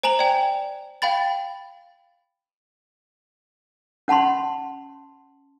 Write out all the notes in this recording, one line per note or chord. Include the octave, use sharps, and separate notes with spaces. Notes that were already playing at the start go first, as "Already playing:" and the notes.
C5 G#5 A#5 F7 F#7
D5 G5
F5 G5 B5 A6
C#4 F#5 A5 B5 C6